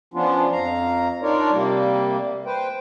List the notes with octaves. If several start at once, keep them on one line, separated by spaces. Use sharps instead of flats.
F3 B3 C#4 D4 F4
F2 F5 A#5
D4 D#4 F4 A#4 C#5 D5
C3 G3 A#3
B4 C5 G5